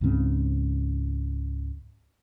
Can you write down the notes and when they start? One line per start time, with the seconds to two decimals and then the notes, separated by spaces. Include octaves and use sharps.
0.01 C#2 G#2 C#3 C4